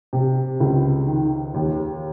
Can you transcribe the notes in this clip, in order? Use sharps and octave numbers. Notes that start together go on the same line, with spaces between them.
C3
C#2
D#3
D#2